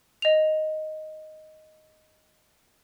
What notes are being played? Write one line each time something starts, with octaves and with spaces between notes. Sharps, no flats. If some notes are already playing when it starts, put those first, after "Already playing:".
D#5 F7